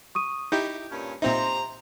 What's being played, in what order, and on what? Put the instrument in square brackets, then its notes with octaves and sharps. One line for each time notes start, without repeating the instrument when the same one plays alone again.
[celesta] C#6 D#6 D#7
[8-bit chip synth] D#4 E4 G4 [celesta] G6
[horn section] G2 A#2 C#4
[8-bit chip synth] A#2 C4 D#4 [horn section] G4 C5 A#5 [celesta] E5 C6